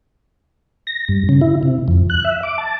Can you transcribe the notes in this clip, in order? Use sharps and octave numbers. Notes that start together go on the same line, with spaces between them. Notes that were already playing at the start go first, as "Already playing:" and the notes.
A#6
G2
C#3
E4
C3
F2
F#6
E5
D6
A5